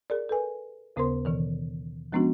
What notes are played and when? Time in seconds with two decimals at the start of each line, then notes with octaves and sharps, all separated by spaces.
0.10 G#4 A#4 D5
0.29 A4 B4 G#5
0.96 D#2 C#3 B3 A#4 C5 C6
1.25 B2 D#3 E3
2.12 F3 G#3 B3 C#4 D4 F#4